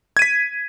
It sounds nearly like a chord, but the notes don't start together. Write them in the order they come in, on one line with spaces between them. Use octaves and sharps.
G#6 D#7 B6